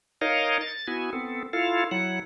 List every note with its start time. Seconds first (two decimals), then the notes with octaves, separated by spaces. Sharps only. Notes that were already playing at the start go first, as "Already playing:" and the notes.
0.21 D#4 A#4 C#5 D#5 F5
0.61 A6
0.87 B3 E4 F#4 G#5
1.13 B3 C4 A4
1.53 E4 F4 A4 F5
1.91 F#3 E4 F#5